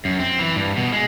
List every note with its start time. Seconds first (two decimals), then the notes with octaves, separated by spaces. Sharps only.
0.05 F#2
0.20 C4
0.39 E3
0.56 G2
0.77 B2
0.92 G#3